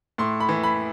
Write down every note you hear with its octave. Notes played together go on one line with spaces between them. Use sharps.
A2 C6
B5
E3
B5